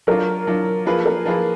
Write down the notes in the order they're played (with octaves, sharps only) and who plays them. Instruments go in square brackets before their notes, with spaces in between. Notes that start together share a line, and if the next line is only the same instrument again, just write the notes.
[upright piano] F#3 D4 F4 [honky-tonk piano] A#4
[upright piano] F#3 D4 F4
F3 A#3 F4 G#4 B4
[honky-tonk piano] A#4
[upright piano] F3 A#3 F4 G#4 B4